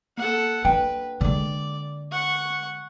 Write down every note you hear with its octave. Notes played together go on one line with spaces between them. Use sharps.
A#3 A4 F#5
D4 B4 G5
D3 G#3 D5
F#5 C#6